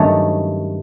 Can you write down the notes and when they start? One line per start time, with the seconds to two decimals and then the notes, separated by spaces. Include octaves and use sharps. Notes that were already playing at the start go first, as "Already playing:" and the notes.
Already playing: G2 D#3 F#3 A3 C#4